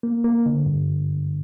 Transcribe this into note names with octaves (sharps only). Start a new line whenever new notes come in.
A#3
A#3
D3
G2